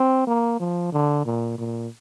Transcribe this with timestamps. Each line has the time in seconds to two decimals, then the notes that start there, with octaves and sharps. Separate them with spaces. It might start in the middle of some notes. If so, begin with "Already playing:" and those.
Already playing: C4
0.27 A#3
0.60 F3
0.92 D3
1.25 A#2
1.58 A#2